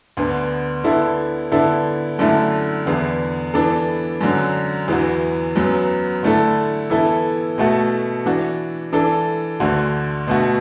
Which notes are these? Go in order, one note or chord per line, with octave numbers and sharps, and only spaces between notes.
D2 D3 B3
D3 B3 E4 A4
D3 B3 E4 A4
F#2 D3 A3 E4 A4
E2 D3 B3
E3 B3 D4 A4
F#2 D3 F#3
E2 E3 B3 F#4
F#2 F#3 B3
D3 A3 E4 A4
E3 B3 E4 A4
B2 A3 F#4 A4
E3 D4 F#4
E3 D4 A4
D2 D3 A3 F#4
B2 A3 F#4